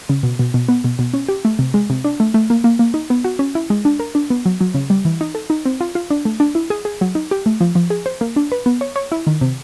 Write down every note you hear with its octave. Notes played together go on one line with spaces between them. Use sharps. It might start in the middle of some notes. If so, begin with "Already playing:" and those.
C#3
B2
B2
B2
B3
B2
B2
C#4
G4
A3
C3
G#3
C3
D4
A3
A3
A#3
A#3
A#3
D#4
B3
F#4
C#4
E4
G#3
D4
A#4
D4
B3
F#3
F#3
C#3
G3
E3
D#4
A4
D#4
C4
F4
F4
D4
A3
D4
E4
G#4
G#4
F#3
D#4
G4
A3
F3
F3
G#4
C5
A#3
D4
B4
B3
C#5
C#5
E4
D#3
C3